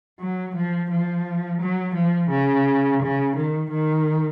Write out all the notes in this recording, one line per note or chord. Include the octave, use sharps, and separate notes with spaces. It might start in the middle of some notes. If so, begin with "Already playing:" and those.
F#3
F3
F3
F#3
F3
C#3
C#3
D#3
D#3